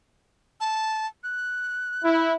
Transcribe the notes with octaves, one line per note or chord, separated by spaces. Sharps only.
A5
F#6
E4